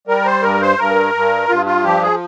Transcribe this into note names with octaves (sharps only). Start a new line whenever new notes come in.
G3 A#4
C5
G2 A#4
C5
G2 A#4
G2
G2 F4
F4
F3 G4
G#4